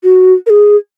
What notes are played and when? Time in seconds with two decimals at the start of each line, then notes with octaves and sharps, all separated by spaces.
0.04 F#4
0.46 A#4
0.50 G#4